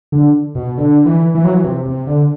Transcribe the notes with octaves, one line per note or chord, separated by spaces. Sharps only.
D3
B2
D3
E3
E3
F#3
E3
C3
C3
D3